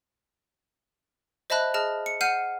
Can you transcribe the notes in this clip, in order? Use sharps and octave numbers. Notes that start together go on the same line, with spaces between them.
C5 D#5 E5 A5 B5 F#6
G#4 D#5 A5 F6
C#7
F#5 F6 G6 C7 D#7